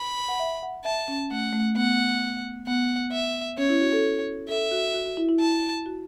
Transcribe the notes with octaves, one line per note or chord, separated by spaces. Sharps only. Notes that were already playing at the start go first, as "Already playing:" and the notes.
Already playing: B5
F#5
E5
F#5
E5 A5
C#4
A3 F#5
A3
B3 F#5
B3 F#5
E5
C#4 C#5
E4
F#4
A4
A4 E5
F#4
F#4
F#4
E4
E4
E4 A5
F#4